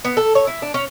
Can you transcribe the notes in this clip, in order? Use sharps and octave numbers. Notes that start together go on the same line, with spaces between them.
B3
A4
C#5
E4
D4
C#4